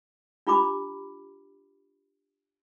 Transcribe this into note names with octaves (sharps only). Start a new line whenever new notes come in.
D4 F4 G4 A#5 B5 D6